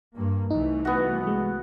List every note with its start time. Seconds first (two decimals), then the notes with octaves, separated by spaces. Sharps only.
0.14 G2 A#3
0.50 C2 E3 A3 D#4
0.85 B3 F#4
1.27 G#3